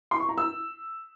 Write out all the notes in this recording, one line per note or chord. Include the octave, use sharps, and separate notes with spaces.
C6
C#6
A#5
E6